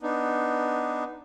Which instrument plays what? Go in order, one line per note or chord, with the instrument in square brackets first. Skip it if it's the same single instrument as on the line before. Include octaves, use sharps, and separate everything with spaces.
[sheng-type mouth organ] B3 D4 D#4